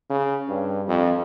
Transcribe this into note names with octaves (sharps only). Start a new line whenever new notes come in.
C#3
G2
F2